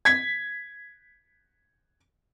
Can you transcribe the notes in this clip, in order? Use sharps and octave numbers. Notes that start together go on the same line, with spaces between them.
G#6 B6